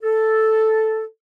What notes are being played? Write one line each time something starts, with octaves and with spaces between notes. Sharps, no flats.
A4